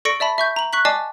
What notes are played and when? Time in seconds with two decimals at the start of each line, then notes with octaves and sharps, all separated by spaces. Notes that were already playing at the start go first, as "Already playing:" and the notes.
0.05 A4 D5 C#6 A#6 C#7 D7
0.20 D5 E5 A5 B5
0.38 E5 C#6 G6
0.56 A#5 F#7
0.73 C#6 F#6 B6 F#7
0.85 D5 D#5 G#5 A5 D6 C7